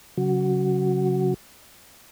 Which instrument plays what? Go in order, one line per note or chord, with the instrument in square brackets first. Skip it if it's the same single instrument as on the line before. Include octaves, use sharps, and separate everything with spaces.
[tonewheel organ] C#3 F#3 F#4